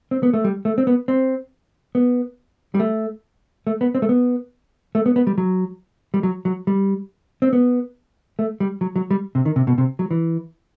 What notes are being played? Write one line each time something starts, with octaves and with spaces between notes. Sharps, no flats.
C4
B3
A3
G3
A3
C4
B3
C4
B3
G3
A3
A3
B3
C4
A3
B3
A3
B3
B3
G3
F#3
G3
F#3
F#3
G3
C4
B3
A3
G3
F#3
F#3
G3
C3
D#3
C3
B2
C3
F#3
E3